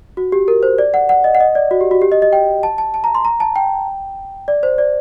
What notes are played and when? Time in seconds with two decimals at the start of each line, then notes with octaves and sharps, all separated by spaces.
0.17 F#4
0.32 G4
0.48 A#4
0.63 C5
0.78 D5
0.94 F#5
1.09 F#5
1.24 D#5
1.35 F#5
1.40 D#5
1.55 D5
1.71 F#4
1.81 G4
1.91 F#4
2.02 G4
2.12 D#5
2.22 D#5
2.33 G5
2.63 A5
2.78 A5
2.94 A5
3.04 A#5
3.15 C6
3.25 A#5
3.40 A5
3.56 G5
4.48 D5
4.63 C5
4.78 D5